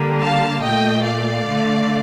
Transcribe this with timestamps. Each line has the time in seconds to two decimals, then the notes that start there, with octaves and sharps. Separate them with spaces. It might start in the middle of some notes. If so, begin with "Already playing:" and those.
Already playing: D3 G3 A#3
0.22 F5 A5
0.63 A#2 A3 D#5 G5
1.04 D5 F5
1.46 D3 A3